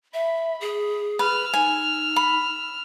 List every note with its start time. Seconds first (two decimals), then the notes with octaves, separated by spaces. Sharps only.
0.14 E5 B5
0.61 G#4
1.19 B4 E6 F6
1.53 D#4 G#5
2.16 B5